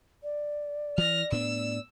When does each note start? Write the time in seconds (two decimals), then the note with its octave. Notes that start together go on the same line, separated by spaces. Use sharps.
0.23 D5
0.98 E3 F6 A#6
1.32 A2 B3 D4 E6